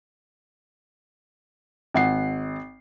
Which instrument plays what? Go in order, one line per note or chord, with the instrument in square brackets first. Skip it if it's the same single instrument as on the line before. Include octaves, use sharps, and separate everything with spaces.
[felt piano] G#1 F#5 C7